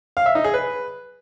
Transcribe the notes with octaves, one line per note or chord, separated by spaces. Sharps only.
F5
E5
D#4
G#4
B4